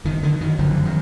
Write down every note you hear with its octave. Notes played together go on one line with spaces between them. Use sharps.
F#1 D#3
D3 D#3
F#2 D#3
F#1 D3 F3
F#2
D#3 F#3